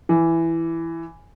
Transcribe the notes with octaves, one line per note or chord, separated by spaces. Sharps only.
E3